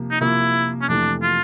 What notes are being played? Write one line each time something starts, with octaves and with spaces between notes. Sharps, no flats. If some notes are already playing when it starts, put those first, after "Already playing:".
Already playing: C3 F3 A#3
D#4
C3 F3 A#3 E4
C#4
F2 C3 E3 A3 D4
F4